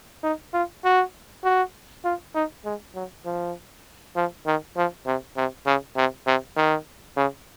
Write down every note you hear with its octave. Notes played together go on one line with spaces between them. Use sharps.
D#4
F4
F#4
F#4
F4
D#4
G#3
F#3
F3
F3
D#3
F3
C3
C3
C#3
C3
C3
D#3
C#3